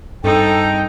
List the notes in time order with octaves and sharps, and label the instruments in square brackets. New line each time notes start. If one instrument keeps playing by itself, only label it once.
[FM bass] G2 [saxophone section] C4 G#4 A4 [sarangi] D#4 [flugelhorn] G5